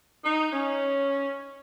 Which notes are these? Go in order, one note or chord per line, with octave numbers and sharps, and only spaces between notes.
D#4
C#4